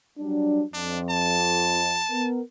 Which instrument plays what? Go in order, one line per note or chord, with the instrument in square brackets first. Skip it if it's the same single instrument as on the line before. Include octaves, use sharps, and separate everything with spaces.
[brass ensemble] F#3 G3 D4
[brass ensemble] F2 [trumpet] D4
[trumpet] A5
[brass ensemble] B3 A#4